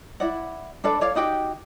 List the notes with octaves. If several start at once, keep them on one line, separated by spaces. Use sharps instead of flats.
E4 D5 F#5
D4 A4 B4 D5
C#5 D5 F5
D#4 F#4 G4 G5